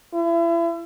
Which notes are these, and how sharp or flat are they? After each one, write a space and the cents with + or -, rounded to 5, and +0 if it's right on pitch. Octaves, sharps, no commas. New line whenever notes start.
E4 +35